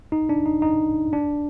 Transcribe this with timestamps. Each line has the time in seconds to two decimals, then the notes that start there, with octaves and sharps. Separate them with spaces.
0.12 D#4
0.29 D4
0.46 D#4
0.62 D#4
1.13 D4